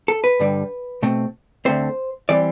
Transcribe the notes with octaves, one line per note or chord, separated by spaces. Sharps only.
A4
B4
G2 D3 G3
B2 A3 C4
D2 D3 A3 C4 C5
E3 G3 C4 D5